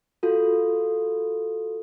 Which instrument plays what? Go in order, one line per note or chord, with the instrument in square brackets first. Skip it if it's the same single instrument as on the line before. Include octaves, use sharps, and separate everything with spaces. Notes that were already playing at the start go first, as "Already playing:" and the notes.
[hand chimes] F4 F#4 A4